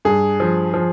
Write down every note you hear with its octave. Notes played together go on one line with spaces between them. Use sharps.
G2 G#4
F3
F3